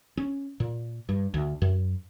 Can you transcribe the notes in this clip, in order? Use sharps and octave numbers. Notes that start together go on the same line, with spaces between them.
C#4
A#2
G2
D2
F#2